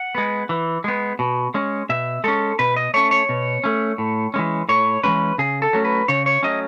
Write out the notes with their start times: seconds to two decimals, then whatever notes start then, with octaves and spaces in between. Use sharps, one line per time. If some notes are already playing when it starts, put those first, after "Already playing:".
Already playing: F#5
0.15 G#3 B3
0.49 E3
0.84 G#3 B3
1.19 B2
1.54 G#3 C#4
1.89 B2 E5
2.24 G#3 C#4 A4
2.59 B2 B4
2.76 D#5
2.94 A3 C#4 C#5
3.11 C#5
3.29 B2
3.64 A3 C#4
3.98 A2
4.34 E3 G#3 C#4
4.69 A2 C#5
5.03 E3 G#3 C#4 B4
5.38 C#3 G#4
5.62 A4
5.73 F#3 A3 C#4
5.85 B4
6.08 C#3 C#5
6.26 C#5
6.43 F#3 A3 C#4 D#5